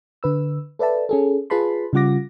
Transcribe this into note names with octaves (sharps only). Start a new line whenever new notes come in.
D3 B4 E6
A4 B4 D5 E5 A5
C#4 G#4 A4
F4 G#4 B4 A5 B5 C6
C#3 G3 F4 F#5 D6 A#6